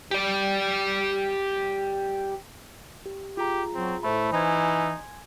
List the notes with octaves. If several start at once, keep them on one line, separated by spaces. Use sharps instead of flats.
G4 D5
G4
F4 G4 G#4 A#5
F#3 C4
A2 A3 C5 B5
E3 D#4 G#5 C6 G#6